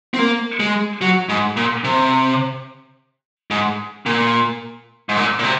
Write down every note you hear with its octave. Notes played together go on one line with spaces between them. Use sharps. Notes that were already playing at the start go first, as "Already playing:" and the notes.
C4
A#3
G#3
F#3
G#2
A#2
C3
G#2
A#2
G#2
A#2
A#2
C3